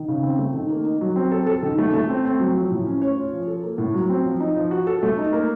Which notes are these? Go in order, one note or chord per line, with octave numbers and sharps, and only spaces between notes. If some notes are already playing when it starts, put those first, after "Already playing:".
Already playing: D#3
C#3
C4
A3
D#3
A#3
D#4
F#3
C4
A4
A4
D#3
A3
A3
C4
C4
F#3
F3
A2
C#4
C#5
F4
F3
A4
A#3
A2
F#3
C4
F3
D#4
F3
F#4
A4
A3
D#4
A#3